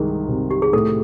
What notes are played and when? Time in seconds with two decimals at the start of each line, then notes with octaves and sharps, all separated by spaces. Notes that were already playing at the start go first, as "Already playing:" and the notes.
Already playing: C2 D#3 G#3 G#4
0.28 C3
0.51 G4
0.62 G#4
0.73 A2 A4